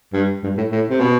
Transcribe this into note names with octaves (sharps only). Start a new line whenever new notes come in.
G2
G2
A2
A2
C3
B2